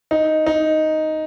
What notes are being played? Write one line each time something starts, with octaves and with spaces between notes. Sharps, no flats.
D#4
D#4